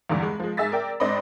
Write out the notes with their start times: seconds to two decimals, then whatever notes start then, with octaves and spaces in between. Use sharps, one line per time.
0.10 E2 G2 D3 E3
0.23 G#3
0.40 F3 G#3
0.57 G#2 G#4 E5 E6 A6 B6
0.72 A#4 D5 G5
1.00 G#2 C4 D4 D5 D#5 B5